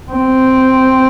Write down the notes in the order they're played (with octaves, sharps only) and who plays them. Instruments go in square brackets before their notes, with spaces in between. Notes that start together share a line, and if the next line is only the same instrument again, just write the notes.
[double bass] C4